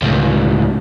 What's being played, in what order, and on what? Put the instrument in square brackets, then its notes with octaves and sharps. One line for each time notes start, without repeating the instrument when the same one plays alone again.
[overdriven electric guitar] C#2 A2